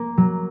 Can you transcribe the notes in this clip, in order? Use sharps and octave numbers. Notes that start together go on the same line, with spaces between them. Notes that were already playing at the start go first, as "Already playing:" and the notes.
Already playing: A#3
F#3